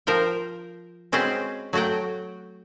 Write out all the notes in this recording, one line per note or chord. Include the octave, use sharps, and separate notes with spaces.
F3 A#4 C5 E5 G5
G#3 C4 C#4 F#4 B4 C5
F#3 A3 F#4 F#5 G5